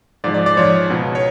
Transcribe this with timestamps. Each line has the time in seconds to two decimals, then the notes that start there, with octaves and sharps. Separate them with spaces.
0.24 G#2 F3 D5
0.34 D5
0.46 D5
0.57 G#2 F3 C#5
0.90 C#2 B2
1.15 C#5